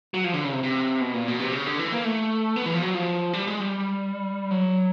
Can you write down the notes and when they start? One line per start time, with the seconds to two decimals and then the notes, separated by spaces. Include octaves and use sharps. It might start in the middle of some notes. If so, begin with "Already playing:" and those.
0.14 F#3
0.24 F3
0.33 D3
0.44 C#3
0.52 C3
0.63 C3
1.01 B2
1.14 A#2
1.28 B2
1.40 C3
1.53 C#3
1.67 D3
1.79 E3
1.92 A#3
2.04 A3
2.56 B3
2.66 E3
2.74 F3
2.82 F#3
2.95 F3
3.33 G3
3.47 G#3
3.60 G3
4.51 F#3